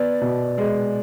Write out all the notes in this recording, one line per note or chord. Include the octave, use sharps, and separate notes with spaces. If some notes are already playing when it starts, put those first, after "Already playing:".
Already playing: B3 D5
B2
G#3